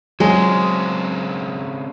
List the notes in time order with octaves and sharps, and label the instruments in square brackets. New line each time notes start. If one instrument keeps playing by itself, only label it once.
[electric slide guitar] C#3 C4 D4 [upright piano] F#3 G#4 G#5 [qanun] G#3